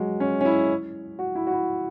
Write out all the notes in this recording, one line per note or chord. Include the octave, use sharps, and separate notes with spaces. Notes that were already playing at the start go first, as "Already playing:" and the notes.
Already playing: F#3 G#3
C#4
C#4
E4
F#4
E4
F#4
E4